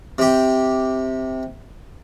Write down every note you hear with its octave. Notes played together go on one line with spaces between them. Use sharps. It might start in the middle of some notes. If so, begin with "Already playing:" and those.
C3 G4